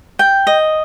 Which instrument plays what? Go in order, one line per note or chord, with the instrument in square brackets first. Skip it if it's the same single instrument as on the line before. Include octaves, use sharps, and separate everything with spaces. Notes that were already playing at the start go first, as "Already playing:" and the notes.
[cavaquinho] G5
D#5